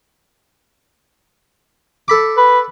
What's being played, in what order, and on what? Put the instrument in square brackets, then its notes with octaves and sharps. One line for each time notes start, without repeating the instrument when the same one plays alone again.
[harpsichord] A4 B5 D6
[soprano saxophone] B4